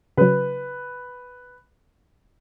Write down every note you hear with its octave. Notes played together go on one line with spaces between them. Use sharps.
C#3 F#3 B4